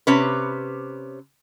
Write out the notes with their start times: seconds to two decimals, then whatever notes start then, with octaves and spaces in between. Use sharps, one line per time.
0.07 C3 C#4 B4